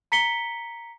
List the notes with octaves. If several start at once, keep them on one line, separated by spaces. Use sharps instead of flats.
A#5 B6 C#7 G7